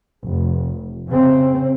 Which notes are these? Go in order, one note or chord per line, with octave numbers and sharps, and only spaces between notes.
F1
C#3 C4